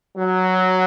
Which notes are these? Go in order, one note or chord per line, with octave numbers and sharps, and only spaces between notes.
F#3